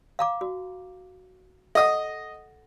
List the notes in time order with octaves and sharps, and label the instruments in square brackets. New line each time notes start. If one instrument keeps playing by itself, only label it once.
[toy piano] F5 A#5 D6
F#4
[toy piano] A4 F#5 [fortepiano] D#5 D#6